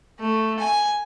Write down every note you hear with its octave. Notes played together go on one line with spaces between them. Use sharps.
A3
G#5